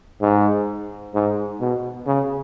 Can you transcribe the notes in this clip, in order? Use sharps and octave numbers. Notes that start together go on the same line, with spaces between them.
G#2
G#2
B2
C#3